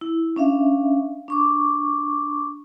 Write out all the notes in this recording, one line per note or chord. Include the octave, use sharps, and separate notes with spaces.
E4
C#4 D4 E5 F5
D4 C#6 D6